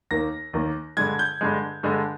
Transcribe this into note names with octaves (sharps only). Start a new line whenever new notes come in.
D#2 D#3 A#3 A#6
D#2 D#3 A#3
G2 D3 G#3 G#6
G6
G2 D3 G#3
G2 D3 G#3